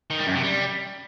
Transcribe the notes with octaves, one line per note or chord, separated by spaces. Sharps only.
D#3
G3
F#2
C3
G3